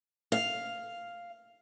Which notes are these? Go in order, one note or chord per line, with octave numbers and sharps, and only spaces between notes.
F5